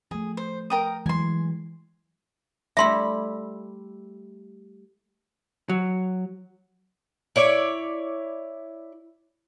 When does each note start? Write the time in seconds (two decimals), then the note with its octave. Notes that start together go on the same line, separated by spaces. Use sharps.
0.11 F3 A3 G#4
0.37 C5
0.70 A#4 G5 D#6
1.06 E3 F#3 G#3 G#5 C6
2.77 G3 A3 E4 E5 C6
5.69 F#3
7.36 E4 C#5 D5